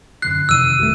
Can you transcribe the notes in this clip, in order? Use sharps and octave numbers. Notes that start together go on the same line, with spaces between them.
F#2 D3 F#6 C7
F2 C3 D#3 E6 D#7
G#1 G3 A3